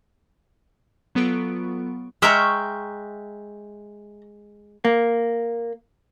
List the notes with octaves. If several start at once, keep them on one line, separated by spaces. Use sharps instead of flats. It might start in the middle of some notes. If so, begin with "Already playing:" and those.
F#3 B3 F4 A4 C#6 D7
G#3 E5 G5 A#5 C#6 F6
A#3